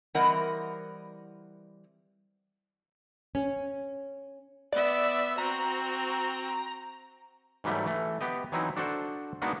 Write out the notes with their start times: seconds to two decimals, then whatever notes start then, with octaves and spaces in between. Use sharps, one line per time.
0.15 E3 G3 C4 A#4 D#5 F#5
3.35 C#4
4.73 B3 D5 E5
5.38 C4 F#4 A#5
7.64 G#2 E3 F#3 G3 A3
7.86 E3 A3
8.21 B3 G4 D#5
8.52 E3 F#3 C4 D#4 E4
8.76 D4 F#4 A4 C5
9.42 G#3 A#3 B3 D4 D#4 F#4